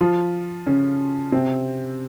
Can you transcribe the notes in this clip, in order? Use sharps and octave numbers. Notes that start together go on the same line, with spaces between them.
F3 F4
C#3 C#4
C3 C4